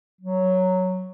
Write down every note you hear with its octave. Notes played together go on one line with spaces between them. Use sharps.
F#3